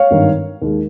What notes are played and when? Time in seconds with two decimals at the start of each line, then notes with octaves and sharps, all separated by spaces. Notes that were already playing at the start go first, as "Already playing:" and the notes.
Already playing: C#5 F5
0.11 G#1 G2 D#3
0.61 D#2 D#3 G#3